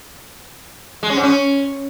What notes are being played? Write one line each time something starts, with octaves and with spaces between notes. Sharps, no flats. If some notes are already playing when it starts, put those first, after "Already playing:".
G#3
C#4
G#2
C#4